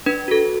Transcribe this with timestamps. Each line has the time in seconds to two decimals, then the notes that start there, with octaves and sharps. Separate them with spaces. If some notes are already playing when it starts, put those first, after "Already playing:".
0.06 D4 B4
0.28 F#4 A4